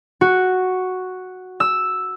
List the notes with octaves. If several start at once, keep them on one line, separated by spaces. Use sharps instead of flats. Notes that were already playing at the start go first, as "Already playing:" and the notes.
F#4
E6